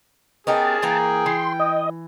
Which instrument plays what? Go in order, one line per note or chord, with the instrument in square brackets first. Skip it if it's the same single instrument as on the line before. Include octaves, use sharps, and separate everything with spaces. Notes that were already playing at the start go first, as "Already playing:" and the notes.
[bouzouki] B3 D#4 G4 [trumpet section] C#4 A#4 [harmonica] G#4 [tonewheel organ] A5
[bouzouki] E3 A#3 A#5 [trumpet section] G5
[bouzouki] E3 [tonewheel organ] C6
[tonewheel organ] D#5